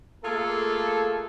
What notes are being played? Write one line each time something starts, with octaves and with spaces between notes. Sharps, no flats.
A3 A#3 F4 G#4 A4